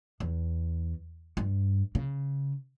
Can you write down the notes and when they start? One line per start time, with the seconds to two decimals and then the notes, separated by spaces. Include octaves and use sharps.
0.20 E2
1.37 G2
1.95 C#3